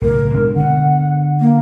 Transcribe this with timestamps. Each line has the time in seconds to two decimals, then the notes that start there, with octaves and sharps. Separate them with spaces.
0.02 B1 A2 C#3 A#4
0.34 B2 G#3 D4
0.56 D3 B3 F#5
1.40 A#3